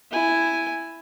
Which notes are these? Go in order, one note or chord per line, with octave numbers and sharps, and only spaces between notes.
E4 G#5